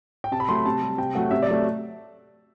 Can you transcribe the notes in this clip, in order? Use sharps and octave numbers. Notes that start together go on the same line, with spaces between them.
G5
C3 A5
B5
F#3 A3 C6
B5
C3 A5
G3
C3 G5
F#3 A3 F#5
C3 E5
D5
F#3 A3 E5